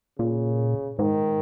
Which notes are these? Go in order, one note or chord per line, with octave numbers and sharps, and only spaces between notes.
A#2 C#3
G#2 D#3